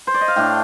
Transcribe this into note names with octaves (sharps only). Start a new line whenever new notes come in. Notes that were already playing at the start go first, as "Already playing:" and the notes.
C5
D5
D#5
F5
A2 A3 D4 G5